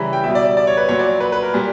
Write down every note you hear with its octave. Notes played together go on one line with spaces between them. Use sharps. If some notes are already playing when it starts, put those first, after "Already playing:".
Already playing: C#3 E3 G3 E5 A#5 B5
G5
B2 G3 E5
D5
D5
D5
C#5
B4
A#2 F#3 C#5
D5
B4
B4
A#4
A#2 G3